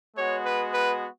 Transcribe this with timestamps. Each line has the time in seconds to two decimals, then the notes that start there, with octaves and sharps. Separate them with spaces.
0.16 G#3 B3 F#4 C#5
0.45 B4
0.73 B4